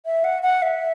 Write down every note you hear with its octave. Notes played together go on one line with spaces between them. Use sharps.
E5
F#5
F#5
E5